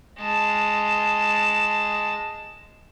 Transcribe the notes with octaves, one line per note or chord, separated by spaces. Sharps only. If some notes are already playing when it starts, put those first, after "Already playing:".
G#3 A5